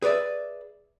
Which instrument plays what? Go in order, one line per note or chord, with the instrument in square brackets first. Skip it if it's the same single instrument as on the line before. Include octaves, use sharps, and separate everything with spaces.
[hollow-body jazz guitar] G#4 B4 C#5 D5 E5